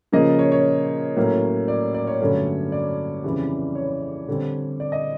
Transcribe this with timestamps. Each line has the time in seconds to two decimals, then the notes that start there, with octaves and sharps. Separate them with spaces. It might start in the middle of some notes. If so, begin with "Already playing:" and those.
0.12 C#3 F3 A#3 D#5
0.39 C#5
0.52 C#5
1.17 A2 F#3 A#3 C#4
1.68 D5
1.94 D5
2.07 C#5
2.21 G2 D3 F#3 A3 C#4
2.72 D5
3.24 F2 C#3 E3 G3
3.75 C#5
4.28 D3 G3 C4
4.80 D5
4.92 D#5